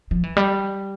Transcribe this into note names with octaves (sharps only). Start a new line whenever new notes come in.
F3
E3
G3